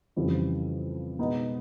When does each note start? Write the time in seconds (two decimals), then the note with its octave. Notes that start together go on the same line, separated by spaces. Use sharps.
0.16 F2 C#3 E3 G3
1.19 B2 G#3 B3 D#4